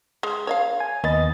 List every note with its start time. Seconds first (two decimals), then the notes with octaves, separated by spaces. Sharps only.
0.23 G#3
0.47 C#5 D#5 F5
0.80 G#5
1.04 D#2 B3 D#5 A6